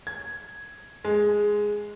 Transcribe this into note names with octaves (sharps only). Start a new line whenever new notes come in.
G#6
G#3